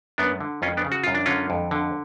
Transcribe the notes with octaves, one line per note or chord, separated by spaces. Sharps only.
F#2 B3 D4
D3
F2 C#4 F4
B3 D4
C#3
F#4
F#2 F4
D4
D3 C#4 F4
F2
D3